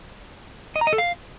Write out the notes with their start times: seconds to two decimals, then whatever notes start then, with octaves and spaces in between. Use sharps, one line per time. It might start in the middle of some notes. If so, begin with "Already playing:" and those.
0.76 D#5
0.81 A#5
0.87 D#5
0.93 A4
0.98 F5